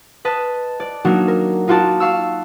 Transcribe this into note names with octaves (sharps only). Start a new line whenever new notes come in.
B4 D#5 A5
D5
F#3 A#3 D4 D#4 F#4
A#4
D#4 F4 F#4 D5 A5
F5 C#6 E6